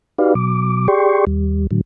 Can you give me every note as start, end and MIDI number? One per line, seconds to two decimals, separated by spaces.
0.18 0.34 63
0.18 0.34 66
0.18 0.34 67
0.18 0.34 71
0.18 0.34 74
0.18 0.34 77
0.35 0.88 47
0.35 0.88 54
0.35 0.88 86
0.88 1.25 67
0.88 1.25 68
0.88 1.25 74
0.88 1.25 79
0.88 1.25 84
0.88 1.25 85
1.27 1.67 39
1.27 1.67 55
1.71 1.81 45
1.71 1.81 50
1.71 1.81 54